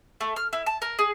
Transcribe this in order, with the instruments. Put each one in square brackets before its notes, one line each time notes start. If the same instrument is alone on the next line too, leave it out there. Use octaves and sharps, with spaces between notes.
[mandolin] A3
F6
E4
A5
A#4
G#4